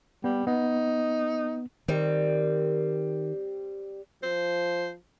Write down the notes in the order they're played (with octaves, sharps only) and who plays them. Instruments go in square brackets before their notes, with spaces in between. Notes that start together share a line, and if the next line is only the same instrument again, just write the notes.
[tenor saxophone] G3 [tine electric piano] B3
[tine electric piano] B3 [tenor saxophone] D#4
[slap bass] D#3 [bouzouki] G3 C4
[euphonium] F3 [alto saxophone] C5